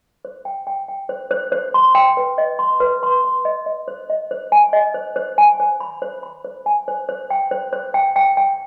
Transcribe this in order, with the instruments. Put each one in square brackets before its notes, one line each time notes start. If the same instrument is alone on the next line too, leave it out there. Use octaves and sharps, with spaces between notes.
[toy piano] C5
G5
G5
G5
C5
C5
C5
C6
G5
B4
D#5
C6
B4
C6
C6
D#5
D#5
C5
D#5
C5
G#5
D#5
C5
C5
G#5
C5
B5
C5
B5
C5
G#5
C5
C5
G5
C5
C5
G5
G5
G5